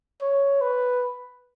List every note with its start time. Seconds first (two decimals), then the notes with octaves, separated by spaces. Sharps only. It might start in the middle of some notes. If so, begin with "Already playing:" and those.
0.22 C#5
0.62 B4